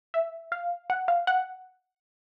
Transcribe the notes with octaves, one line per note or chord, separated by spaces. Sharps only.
E5
F5
F#5
F5
F#5